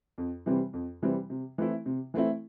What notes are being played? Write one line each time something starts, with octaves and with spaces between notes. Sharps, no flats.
F2
C3 E3 G3 C4
F2
C3 E3 G3 C4
C3
E3 A3 C4 E4
C3
E3 A3 C4 E4